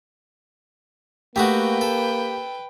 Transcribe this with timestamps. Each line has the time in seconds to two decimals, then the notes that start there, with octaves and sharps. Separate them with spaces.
1.36 A3 A#3 D#4 F#4 G4 B4 G5
1.81 A4